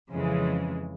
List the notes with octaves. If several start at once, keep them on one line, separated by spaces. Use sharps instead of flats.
F2 C#3 E3 G#3